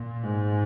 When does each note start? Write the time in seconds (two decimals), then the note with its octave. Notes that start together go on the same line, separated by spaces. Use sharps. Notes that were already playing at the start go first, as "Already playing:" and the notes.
Already playing: A#2
0.23 G#2